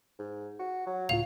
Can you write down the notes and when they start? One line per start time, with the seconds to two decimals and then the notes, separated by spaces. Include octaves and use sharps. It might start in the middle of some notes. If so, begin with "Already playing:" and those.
0.19 G#2
0.60 F#4
0.87 F#3
1.09 C#2 A2 F4 F5 F7